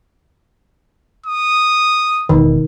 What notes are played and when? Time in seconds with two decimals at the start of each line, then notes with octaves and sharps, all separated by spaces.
1.26 D#6
2.29 E1 D#3 E3